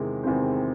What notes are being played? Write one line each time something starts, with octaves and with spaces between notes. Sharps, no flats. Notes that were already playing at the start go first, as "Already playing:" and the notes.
Already playing: E2 C3 D#3 G#3 C4
E2 C3 D#3 G#3 C4